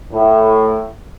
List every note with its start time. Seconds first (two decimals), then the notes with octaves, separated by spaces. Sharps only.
0.12 A2